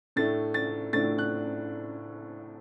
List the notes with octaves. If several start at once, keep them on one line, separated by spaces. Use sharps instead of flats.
A2 A3 D4 A6
A6
A2 A3 D4 A6
F#6